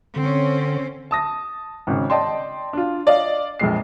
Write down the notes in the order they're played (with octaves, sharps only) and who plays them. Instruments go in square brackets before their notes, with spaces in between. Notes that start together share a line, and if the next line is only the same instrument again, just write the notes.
[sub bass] D3 [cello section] C4 C#4
[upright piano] A5 D#6 A#6
G#1 C#3
D5 D#5 G5 A5 C6
D4 F4
D5 D#5 F5
A#1 F2 G#3 C7